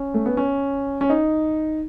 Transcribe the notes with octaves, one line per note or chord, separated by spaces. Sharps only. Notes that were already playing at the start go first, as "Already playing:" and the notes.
Already playing: C#4
A3
B3
C#4
C#4
D#4